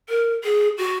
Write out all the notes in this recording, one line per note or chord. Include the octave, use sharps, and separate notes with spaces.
A#4
G#4
F#4